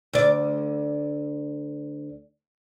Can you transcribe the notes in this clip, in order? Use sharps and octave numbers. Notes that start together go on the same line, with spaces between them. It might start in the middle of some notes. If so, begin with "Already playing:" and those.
D2 D5